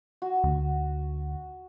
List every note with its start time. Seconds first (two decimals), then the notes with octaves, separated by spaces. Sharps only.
0.22 F#4
0.44 D2